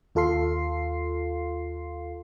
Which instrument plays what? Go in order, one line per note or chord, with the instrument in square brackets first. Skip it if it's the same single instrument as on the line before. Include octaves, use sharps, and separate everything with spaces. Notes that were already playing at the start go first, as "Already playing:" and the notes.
[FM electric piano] D#2 F4 A4 F5 C6 C7